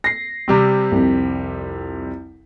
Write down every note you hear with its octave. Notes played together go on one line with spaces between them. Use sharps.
A#6 C7
C3 G3 C4
C2 F2